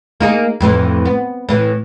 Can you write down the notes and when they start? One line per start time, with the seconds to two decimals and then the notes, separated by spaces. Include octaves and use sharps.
0.20 A#3 D#4 G#4
0.60 F2 A2 E3
1.05 B3
1.49 A2 E3